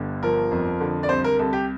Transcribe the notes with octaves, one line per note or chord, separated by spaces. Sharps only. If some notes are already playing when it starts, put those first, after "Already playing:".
Already playing: G1 D3
F3 A#4
F2
D3
D5
C2 C5
A#4
C2 A4
G4